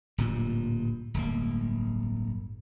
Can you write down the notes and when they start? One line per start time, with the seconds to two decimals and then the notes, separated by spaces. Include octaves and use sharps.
0.18 D1 G2 A#2
1.14 D1 G1 A#3